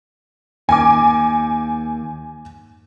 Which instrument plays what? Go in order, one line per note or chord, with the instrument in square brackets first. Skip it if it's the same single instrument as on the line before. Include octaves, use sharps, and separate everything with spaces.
[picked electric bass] D#2 [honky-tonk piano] G#5 D6